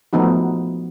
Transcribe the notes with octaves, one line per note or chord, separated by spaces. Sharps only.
F3 A3 B3 D#4 F#4